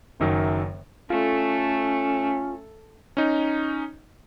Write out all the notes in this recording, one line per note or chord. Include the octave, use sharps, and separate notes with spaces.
F#1 F#2 D#3 F#3
A3 C#4 F4 A4
C#4 D#4